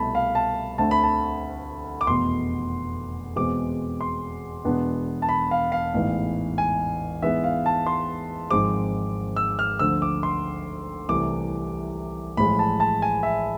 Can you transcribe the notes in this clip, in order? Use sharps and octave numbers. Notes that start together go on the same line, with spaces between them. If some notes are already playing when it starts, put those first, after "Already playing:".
Already playing: C2 B2 A3 A5 B5
F5
A5
D2 D3 A3 C4 A5
B5
A5
D6
F1 E2 B2 C6
E2 B2 G#3 C4 D6
C6
E1 E2 B2 B3 D4
A5
B5
F5
F5
A1 G#2 E3 B3
G#5
G#2 E3 G#3 B3 E5
F5
A5
C6
G#1 G#2 F3 G#3 C4 D6
E6
F6
D2 D3 F3 E6
D6
C6
C2 C3 E3 A3 D6
A1 A2 F3 G#3 B5
A5
A5
G#5
E5